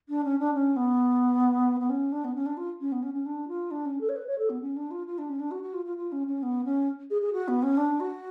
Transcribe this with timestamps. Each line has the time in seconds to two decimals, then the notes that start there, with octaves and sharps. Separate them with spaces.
0.08 D4
0.24 C#4
0.39 D4
0.53 C#4
0.76 B3
1.79 B3
1.89 C#4
2.12 D4
2.24 B3
2.35 C#4
2.45 D4
2.57 F4
2.80 C#4
2.91 B3
3.02 C#4
3.14 C#4
3.25 D4
3.48 F4
3.70 D4
3.85 C#4
4.00 A4
4.08 C#5
4.15 B4
4.27 C#5
4.38 A4
4.49 B3
4.61 C#4
4.76 D4
4.90 F4
5.06 F4
5.18 D4
5.29 C#4
5.39 D4
5.51 F#4
5.62 F#4
5.73 F4
5.85 F4
5.97 F4
6.11 C#4
6.27 C#4
6.42 B3
6.64 C#4
7.10 G#4
7.21 G#4
7.32 F#4
7.47 B3
7.62 C#4
7.77 D4
8.00 F#4